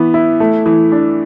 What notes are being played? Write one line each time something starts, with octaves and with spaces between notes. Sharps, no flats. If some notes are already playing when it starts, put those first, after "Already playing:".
Already playing: E3 B3
E4
A3
E3
D4